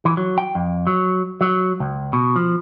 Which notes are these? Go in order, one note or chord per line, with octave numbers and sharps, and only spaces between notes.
E3
F#3
G5
F2
F#3
F#3
C#2
B2
F3